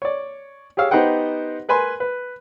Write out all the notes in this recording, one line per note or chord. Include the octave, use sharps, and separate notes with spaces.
C#5 D5
G4 G#4 C#5 F5 E6
B3 D#4 G4 C5 F#5 G5
A#4 B4 G#5 B5 C6
B4